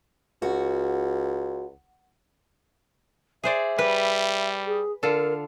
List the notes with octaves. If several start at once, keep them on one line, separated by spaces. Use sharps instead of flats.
C#2 F#4
G#4 C5 D5 E5
G3 B4
G#4
D3 F4 A4 A#4